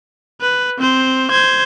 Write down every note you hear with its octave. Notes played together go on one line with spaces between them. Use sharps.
B4
C4 C5
C5 G#6